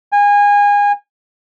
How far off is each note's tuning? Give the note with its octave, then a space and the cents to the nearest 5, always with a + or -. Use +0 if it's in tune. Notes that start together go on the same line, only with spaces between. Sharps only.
G#5 -25